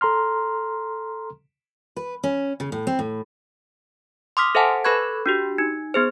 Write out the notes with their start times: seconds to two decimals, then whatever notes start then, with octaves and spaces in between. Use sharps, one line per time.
0.01 A4 A#5 C6 F6
1.96 B4
2.24 C#4
2.60 C#3
2.72 A2
2.87 C4
2.99 A2
4.37 C6 D6 D#6 F6 B6
4.55 A4 C5 E5 F#5 G#5 A5
4.84 A4 B4 B5 C#6 F#6 G#6
5.26 D4 F#4 G4
5.58 D#4
5.94 B3 G#4 C5